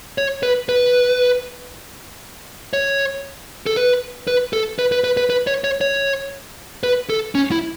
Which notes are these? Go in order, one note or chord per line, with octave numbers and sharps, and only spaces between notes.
C#5
B4
B4
C#5
A4
B4
B4
A4
B4
B4
B4
B4
B4
C#5
C#5
C#5
B4
A4
C#4
E4